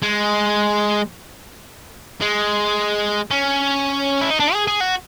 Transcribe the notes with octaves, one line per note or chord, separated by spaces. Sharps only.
G#3
G#3
C#4
E4
D#4
D4
G#4
G#4
F#4